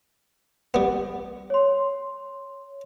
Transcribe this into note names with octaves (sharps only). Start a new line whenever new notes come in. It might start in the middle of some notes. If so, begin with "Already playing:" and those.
G3 B3
C#5 C6